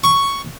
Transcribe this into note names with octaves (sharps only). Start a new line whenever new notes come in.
C#6